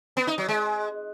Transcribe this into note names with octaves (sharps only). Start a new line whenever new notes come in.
B3
D#4
F#3
G#3